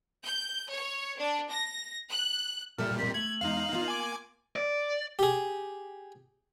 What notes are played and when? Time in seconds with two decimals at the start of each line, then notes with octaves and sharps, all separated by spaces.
0.24 G6
0.70 C#5
1.19 D4
1.51 A#6
2.10 F#6
2.78 A#2 G3 A4 E5 F6
2.98 C4 A#4 D#5 B6
3.14 A3 A4 G#6 F#7
3.41 E2 G#3 D#4 F5
3.73 A#3 F4
3.88 G#5 D6
4.56 D5
5.19 G4 G#4